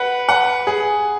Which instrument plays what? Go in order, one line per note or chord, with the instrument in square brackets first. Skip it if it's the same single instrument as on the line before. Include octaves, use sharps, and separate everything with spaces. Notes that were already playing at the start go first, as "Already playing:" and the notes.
Already playing: [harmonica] B4 [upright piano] F#5
[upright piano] F#5
G#4